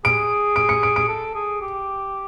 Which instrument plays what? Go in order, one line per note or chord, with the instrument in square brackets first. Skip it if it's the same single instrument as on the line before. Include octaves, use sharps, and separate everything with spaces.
[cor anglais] G#4 [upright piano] D7
[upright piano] D7
C#7
D7
D7
[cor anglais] A4
G#4
G4